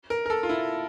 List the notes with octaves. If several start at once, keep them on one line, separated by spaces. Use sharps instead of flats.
A#4
A#4
A4
F4
E4